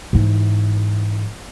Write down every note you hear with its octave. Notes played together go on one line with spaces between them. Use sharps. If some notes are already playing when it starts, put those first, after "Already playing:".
G#2 E3